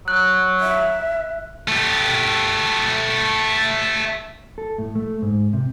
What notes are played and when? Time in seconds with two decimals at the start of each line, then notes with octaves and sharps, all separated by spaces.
0.08 F#3 F#6
0.60 E5
1.68 A3 G4
4.58 A4
4.78 A2
4.95 A3
5.22 G#2
5.53 C3